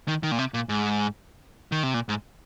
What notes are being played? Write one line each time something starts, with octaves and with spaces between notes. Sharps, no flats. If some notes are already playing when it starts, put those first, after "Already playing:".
D#3
D#3
A#2
C3
A#2
G#2
D#3
C3
A#2
G#2